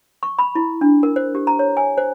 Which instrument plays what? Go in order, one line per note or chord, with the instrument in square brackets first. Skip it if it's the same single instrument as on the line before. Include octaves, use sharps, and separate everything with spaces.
[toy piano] C#6
B5
E4
D4
A#4
C5
G4
A#5
C#5
G#5
C5